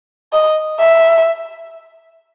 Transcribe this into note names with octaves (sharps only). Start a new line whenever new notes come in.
D#5
E5